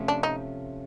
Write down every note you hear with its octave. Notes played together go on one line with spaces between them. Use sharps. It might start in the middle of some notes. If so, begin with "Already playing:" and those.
Already playing: C3 F3 A3 C#4 F4
D4
D#4